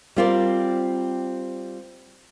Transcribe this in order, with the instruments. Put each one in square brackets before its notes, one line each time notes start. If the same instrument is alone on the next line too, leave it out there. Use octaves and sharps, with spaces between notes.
[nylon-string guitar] G3 C4 F4 A#4 D5